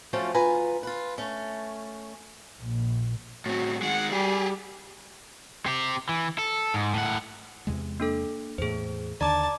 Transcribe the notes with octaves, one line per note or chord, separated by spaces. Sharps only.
F3 F#3 A3 C4 C#4 F4
D2 F4 B4 G#5 A#5
F4 B4
A3 C#4
A#1
A2 C4 F#4
D#3 G#3 F#5
G3 G4 G#4
C4 G4
E3
A4
G#2
A2 F#5
E2 C3 G#3
A#3 D4 A4
E2 A2 G#4 C5
D#2 D3 D5 A5 A#5 D6